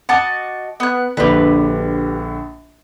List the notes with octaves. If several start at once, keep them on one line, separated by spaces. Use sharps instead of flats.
F#4 D#5 A5 D6
B3 F#6
A#1 D3 G4 B4